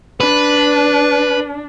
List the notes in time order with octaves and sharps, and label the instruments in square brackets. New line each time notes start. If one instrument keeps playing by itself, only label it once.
[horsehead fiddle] D4 [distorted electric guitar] B4